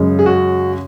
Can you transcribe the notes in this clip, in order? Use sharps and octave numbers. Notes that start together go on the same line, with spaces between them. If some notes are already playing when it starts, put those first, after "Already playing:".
Already playing: F#2 C#3 G#3
G#4
F#4